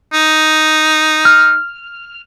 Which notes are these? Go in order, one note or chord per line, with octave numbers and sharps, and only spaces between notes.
D#4
F6